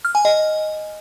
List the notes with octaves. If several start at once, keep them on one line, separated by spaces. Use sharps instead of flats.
F6
G#5
D#5